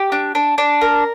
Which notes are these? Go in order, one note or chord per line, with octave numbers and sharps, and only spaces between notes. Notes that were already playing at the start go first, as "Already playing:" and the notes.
Already playing: G4
D4
D4
D4
A#4